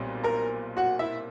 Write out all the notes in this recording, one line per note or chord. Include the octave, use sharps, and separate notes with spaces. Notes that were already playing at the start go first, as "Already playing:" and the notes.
Already playing: B1 A#2 G3 C4
A#4 A#5
F#4 F#5
E4 E5